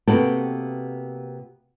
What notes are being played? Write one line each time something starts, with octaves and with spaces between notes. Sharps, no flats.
C3 A#3 B3 F#4 A4 G5